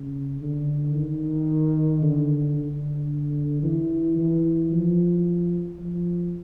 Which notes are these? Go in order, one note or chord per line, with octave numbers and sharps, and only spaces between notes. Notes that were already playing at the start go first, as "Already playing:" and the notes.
Already playing: C#3
D3
D#3
D3
D3
E3
E3
F3
F3